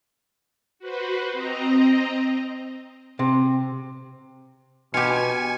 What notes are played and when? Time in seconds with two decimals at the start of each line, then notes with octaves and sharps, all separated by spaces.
0.79 F#4 B4 C5
1.32 C4 D#5 A#5
3.19 C3
4.94 B2 F4 G4 G#5 C#7